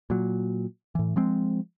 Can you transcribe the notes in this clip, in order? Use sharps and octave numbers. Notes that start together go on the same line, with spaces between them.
A#2 F#3
A2 E3
F3 G#3 C4